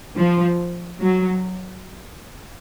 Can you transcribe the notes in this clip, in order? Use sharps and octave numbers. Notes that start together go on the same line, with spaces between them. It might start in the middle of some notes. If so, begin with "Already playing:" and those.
F3
F#3